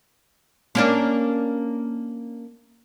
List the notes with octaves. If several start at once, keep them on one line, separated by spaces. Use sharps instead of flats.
A#3 C#4 D4